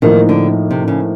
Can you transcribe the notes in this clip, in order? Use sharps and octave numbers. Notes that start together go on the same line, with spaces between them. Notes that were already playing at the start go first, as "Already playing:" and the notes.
A2 D#3 F3 A#3 D#4
D3
C3
C#3